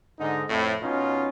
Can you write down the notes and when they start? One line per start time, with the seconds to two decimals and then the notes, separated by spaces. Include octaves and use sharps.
0.19 G#2 D3 D#4
0.49 F2 A2
0.81 B2 C#4 D#4 F4